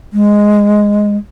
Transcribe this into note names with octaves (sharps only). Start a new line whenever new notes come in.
G#3